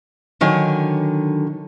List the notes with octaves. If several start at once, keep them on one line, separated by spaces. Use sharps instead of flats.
D3 D#3 F#3 G#5